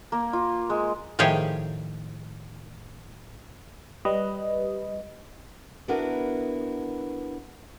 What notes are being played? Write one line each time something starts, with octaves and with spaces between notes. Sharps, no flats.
A#3
F4
G#3
A2 D#3 F3 G4 G#4 C#5
G3 B4 D#5
B3 D4 E4 F#4 A#4 B4